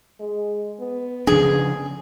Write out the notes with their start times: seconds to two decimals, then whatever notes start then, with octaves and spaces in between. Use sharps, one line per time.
0.20 G#3
0.80 B3
1.27 C#3 F3 D4 G#4